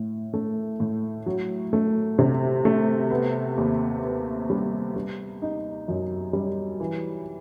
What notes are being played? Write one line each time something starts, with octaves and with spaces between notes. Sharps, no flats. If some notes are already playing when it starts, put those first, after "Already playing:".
Already playing: A2
A3
A2
F#3
A3
C3
A3
B3
D#2
B3
G3
G3
D#4
F#2
G3
E3